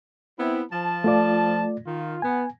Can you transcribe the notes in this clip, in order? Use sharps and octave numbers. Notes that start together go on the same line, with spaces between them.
B3 C4 E4
F3 A5
A3 F4 D5
D#3 F4
B3 G#5